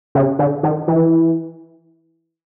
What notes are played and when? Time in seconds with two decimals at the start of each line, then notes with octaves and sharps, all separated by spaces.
0.15 C#3
0.39 D3
0.63 D#3
0.88 E3